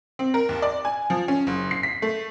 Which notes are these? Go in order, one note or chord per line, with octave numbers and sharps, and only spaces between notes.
C4
A#4
D#2
D5
G#5
F3
C#4
F#1
C7
B6
A3